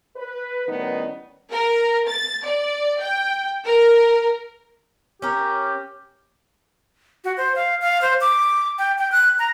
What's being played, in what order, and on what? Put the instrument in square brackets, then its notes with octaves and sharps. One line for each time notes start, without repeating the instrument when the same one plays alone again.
[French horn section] B4
A2 D#3 G3 B3 C#4 D#4
[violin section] A#4
A6
D5
G5
A#4
[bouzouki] C#4 A#4 [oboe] G4
[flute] F#4
C5
F5
F5
C5
D6
G5
G5
F#6
A#5